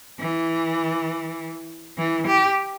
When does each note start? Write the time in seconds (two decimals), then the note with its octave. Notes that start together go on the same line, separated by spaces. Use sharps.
0.20 E3
1.98 E3
2.27 G4